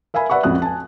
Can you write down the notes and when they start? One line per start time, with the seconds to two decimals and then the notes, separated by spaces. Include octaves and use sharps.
0.14 A#4 E5 F5 G#5 B5
0.30 B4 D5 E5 F#5 B5 C#6
0.43 A1 F2 F#4 D#6 F#6
0.62 G#5 A5